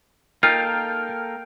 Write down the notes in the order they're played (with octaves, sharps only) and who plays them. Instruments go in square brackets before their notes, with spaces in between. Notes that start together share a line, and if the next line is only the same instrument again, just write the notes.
[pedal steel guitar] A#3 A4 A#4 [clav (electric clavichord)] D#4 F4 [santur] G5 [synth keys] F6